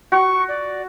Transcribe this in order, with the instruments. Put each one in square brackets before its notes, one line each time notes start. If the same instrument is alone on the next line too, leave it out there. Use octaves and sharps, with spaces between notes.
[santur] F#4 [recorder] C#6
[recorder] D5